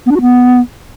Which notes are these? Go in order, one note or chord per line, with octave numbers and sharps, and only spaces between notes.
B3
D4
F#4
B3